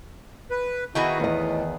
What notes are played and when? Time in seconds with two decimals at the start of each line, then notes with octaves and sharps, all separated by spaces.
0.50 B4
0.95 D#3 B3 E4 F#4 G#4
1.20 E2 A2 D#5